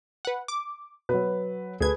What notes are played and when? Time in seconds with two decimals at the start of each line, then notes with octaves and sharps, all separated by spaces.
0.25 B4 F#5
0.48 D6
1.09 B2 F#3 B4
1.80 D2 G#4 A4 B4 G#6